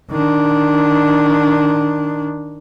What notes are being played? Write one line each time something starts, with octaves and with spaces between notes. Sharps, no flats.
D#3 D4